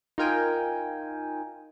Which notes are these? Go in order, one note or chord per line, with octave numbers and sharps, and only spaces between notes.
D#4 F4 A#4 G5 G#5